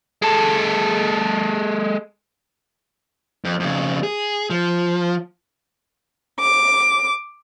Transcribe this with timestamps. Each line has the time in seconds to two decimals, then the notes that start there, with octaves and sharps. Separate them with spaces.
0.22 G#3 A4
3.44 F2
3.60 F2 C#3
4.03 G#4
4.50 F3
6.40 D6